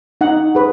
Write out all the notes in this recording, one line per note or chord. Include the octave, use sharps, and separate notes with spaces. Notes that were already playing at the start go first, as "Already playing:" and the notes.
D#4 F#5
G#4 B4